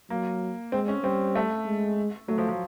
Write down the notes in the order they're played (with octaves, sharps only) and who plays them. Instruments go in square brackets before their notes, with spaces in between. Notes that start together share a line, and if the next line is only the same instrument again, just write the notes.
[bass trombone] F#3 [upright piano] A#3
[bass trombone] G#3 [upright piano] C4
[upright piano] C#4
[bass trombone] G3 [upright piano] C4
[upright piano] A3
[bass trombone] G#3
[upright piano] F#3 [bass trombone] A3
[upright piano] F3
F3